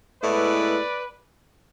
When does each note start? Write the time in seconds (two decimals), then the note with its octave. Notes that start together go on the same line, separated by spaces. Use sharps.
0.21 A2 G#3 B3 E4 B4 D5